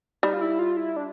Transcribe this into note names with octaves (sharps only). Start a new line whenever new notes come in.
G3 D#4
F4
E4
F4
E4
D4